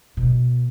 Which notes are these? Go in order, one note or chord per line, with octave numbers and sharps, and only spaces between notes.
B2